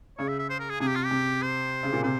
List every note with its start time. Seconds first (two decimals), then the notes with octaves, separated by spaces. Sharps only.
0.18 C#3 C#5
0.28 E5
0.39 E5
0.50 C5
0.59 A#4
0.70 G#4
0.80 C3 G#4
0.88 G4
0.95 F4
1.05 G4
1.11 C3
1.42 C5
1.83 C#3
1.93 A#2
2.03 C3 C5